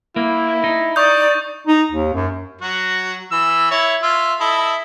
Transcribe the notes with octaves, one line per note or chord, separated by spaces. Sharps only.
A#3 E4
D#4
D5 C#6 D#6 G6
D#4
D#2
F#2
F#3 F#4
E3 E6
E4 C#5
F4 E5
E4 A4 D#5